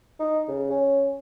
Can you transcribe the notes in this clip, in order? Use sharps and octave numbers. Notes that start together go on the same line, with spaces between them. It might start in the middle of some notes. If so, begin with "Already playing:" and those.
D#4
C#3
C#4